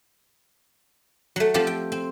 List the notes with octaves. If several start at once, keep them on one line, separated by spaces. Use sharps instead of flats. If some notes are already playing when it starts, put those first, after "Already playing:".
F#3 A3
F3 C4 F4 G4 A4 F5
G5
C4